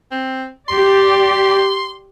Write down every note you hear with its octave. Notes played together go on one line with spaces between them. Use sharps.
C4
G4 D5 C6